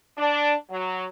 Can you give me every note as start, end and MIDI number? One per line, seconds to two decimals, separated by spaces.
0.17 0.53 62
0.70 1.04 54